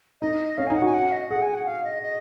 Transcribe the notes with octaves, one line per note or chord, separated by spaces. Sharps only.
D#4 D#5
C#4 F5
D#4 G#5
F#5
F#4 G#5
F#5
D#5
G#4 F#5
G#5
F#5
F5
D#5
D#5